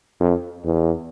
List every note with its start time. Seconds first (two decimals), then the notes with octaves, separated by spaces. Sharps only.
0.20 F2
0.65 E2